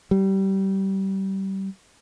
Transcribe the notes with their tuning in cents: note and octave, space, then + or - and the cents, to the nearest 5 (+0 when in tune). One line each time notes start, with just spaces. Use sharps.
G3 -25